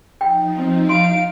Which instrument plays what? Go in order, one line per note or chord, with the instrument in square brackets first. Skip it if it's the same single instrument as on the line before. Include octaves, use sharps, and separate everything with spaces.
[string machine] F3 D#4 [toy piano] G5
[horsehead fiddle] C4
[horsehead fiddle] F5 [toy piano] C6 [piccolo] D7